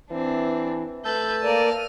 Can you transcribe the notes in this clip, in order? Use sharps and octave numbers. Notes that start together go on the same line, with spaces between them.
E3 C4 D4
A3 B4 A5 E6 G6
A#3 A#4 D5 F6 D#7